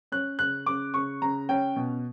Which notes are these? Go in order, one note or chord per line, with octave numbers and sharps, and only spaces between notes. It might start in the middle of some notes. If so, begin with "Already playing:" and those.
C#4 F#6
C#3 F#6
C#3 D6
C#3 C#6
C#3 A#5
C#4 G5
B2